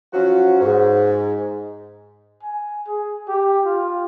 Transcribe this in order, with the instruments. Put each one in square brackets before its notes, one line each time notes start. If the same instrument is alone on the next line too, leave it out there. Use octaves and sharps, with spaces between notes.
[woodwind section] F3 F#3 C#4 F4 F#4
G#2
[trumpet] G#5
G#4
G4
F4